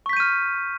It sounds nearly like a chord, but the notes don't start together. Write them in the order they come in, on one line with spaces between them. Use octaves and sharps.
C#6 B6 G6 D#7 F6